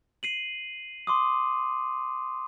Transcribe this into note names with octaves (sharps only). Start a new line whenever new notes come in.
C7 D#7 F#7
C6 D6 D#6